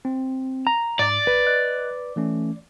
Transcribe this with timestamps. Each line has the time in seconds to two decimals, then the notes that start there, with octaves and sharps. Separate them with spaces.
0.05 C4
0.67 A#5
0.99 G#2 D5
1.27 A#1 B4
1.47 D#5 F#6
2.16 E3 A3 C#4